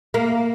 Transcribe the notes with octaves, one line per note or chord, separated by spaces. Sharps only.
A#3